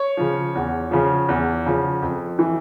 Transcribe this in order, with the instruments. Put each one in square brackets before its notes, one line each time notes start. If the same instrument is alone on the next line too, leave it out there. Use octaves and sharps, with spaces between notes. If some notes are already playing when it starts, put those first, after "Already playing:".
Already playing: [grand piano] C#5
C#3 F3
E2
C#3 F3
E2
C#3 F3
F2
E3